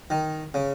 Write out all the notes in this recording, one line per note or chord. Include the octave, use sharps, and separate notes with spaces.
D#3
C#3